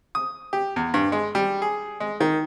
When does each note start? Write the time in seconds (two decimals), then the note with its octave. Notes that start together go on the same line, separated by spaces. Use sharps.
0.15 D#6
0.53 G4
0.76 E2
0.94 G2
1.12 G#3
1.35 G3
1.62 G#4
2.00 G#3
2.20 D#3